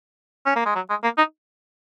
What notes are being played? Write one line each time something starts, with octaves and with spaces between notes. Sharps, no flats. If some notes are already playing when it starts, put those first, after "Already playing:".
C#4
A#3
G#3
F#3
G#3
A#3
D#4